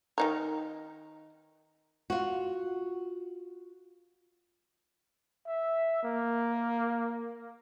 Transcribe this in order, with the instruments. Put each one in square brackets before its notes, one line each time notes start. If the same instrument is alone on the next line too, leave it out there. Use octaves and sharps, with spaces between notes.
[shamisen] D#3 D#4 A#4
[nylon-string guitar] F4 F#4
[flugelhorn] E5
A#3